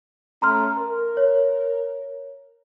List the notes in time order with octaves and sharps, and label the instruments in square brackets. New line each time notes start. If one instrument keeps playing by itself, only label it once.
[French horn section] A3 C#4 [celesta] A#5 C6 F6
[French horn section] A#4
[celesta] C#5